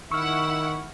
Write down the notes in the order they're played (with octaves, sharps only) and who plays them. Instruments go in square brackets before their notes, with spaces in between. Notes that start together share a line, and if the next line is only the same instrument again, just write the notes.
[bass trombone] D#3 [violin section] E4 F#5 [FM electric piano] C#6 F6 [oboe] E6